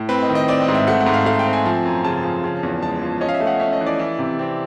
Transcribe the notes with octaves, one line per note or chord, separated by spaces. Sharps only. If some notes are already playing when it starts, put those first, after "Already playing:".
Already playing: A2
C4 B4
D#5
D#3
D#5
C4 D5
D#5
G#2
E5
A3 F#5
F#5
G#2
F5
A3 F5
G5
C4
G#5
F3
F#2
C#3 A5
F3
C#3
E2
G#3 A5
F3
C#4 D#5
F5
E5
A3
F#5
C#4 E5
D#5
E3
D5
E3
C3
C4